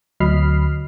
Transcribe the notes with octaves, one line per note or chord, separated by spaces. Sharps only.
D2 F#3 D#5 B5 F6 C7